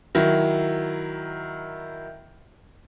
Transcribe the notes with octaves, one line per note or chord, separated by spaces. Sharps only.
D#3 F#3 E4